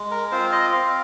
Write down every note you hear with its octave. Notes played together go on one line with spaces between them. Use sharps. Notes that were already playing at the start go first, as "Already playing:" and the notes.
Already playing: G#3
A#4
C4 F4 C5
D#5
C4 F5